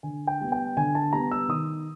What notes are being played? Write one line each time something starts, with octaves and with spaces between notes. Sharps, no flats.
D3 G#5
G5
G3 B3
G5
D3 G#5
A5
G3 B3 A#5
E6
D#3 D#6